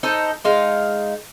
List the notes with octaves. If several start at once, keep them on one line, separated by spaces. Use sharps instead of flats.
D#4 A4 C5 D#5
G#3 D#4 F5